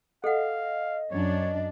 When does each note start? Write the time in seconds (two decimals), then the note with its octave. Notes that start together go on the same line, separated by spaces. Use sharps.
0.24 A4 D#5 F5 F#5
1.11 F#2 D4 C#5